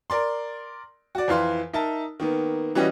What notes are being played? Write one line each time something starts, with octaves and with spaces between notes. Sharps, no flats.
A#4 D5 C6
F#4 D5
F2 E3 F5 C6
D#4 A#4 E5 A5
D#3 A#3 B3
E3 G3 C#4 F#4 D#5